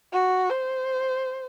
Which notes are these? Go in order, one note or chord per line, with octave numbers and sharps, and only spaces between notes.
F#4
C5